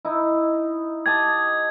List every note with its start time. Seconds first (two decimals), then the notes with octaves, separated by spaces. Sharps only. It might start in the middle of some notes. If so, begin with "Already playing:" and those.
0.05 D#4 E4
1.06 G4 D#5 A5 G#6